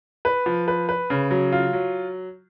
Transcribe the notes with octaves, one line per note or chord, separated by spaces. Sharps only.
B4
F3
B4
B4
C#3
F#3
F4
F#3